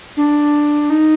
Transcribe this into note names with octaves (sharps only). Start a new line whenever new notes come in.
D4
D#4